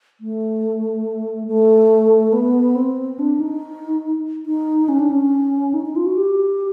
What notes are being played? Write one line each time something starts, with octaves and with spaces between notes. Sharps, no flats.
A3
A3
B3
C4
D4
D#4
D#4
C#4
D4
C#4
D#4
D#4
F4
F#4
G4